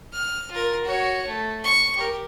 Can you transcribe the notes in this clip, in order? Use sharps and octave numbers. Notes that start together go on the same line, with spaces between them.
F6
F4 A#4
F#4 C#5
A3
C#6
G4 A#4